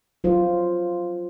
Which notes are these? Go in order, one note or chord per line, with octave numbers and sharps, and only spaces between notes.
F#3 F4 C5